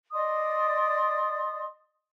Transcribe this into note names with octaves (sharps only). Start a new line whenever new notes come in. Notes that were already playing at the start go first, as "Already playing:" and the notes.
D5 D#5 C6 D#6